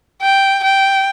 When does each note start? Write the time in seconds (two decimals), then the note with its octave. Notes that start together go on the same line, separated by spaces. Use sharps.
0.22 G5
0.64 G5